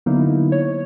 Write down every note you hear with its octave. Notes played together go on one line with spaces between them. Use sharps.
D3 F#3 A#3 B3 D#4 E4
C#5